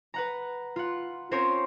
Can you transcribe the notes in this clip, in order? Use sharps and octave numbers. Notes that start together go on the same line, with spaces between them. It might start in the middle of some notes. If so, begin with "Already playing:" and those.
B4 F#5 A#5
F4 F#5
C4 C#4 F4 A#4 C5 C#5